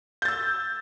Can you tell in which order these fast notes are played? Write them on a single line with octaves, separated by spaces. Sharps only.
G6 A6 E6